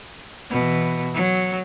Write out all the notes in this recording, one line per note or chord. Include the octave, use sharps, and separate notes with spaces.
B2 E3
F#3